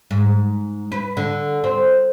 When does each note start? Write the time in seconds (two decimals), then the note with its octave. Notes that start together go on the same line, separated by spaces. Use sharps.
0.11 G#2
0.92 B4
1.17 D3
1.64 C4